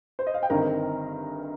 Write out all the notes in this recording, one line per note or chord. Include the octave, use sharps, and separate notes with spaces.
C5
D#5
F5
G5
G1 G2 D#3 C4 A#4 A#5